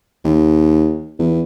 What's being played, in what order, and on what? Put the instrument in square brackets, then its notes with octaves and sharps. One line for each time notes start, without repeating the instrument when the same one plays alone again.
[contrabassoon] D#2
E2